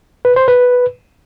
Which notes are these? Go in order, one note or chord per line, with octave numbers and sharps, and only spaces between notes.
B4
C5
B4